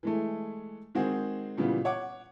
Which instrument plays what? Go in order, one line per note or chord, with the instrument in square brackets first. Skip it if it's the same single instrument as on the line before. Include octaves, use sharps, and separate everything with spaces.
[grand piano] E3 G#3 A3
D#3 G#3 C4 F#4 G#4
A#2 C#3 E3 G3 B3
C#5 F#5 D6